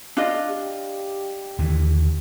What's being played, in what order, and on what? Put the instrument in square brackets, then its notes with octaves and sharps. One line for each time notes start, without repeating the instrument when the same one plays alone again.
[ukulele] D4 F4 D#5
[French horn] G4
[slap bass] D#2 D3 E3